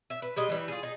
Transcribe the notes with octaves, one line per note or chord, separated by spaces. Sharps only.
E5
B4
G3 G#3 D#5
E3 G3
F4 G#4
D#4 G#4